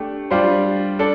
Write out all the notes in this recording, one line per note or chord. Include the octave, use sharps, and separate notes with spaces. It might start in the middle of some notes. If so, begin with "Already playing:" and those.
Already playing: A3 D4 G4
G3 D4 F4 C5
D4 A4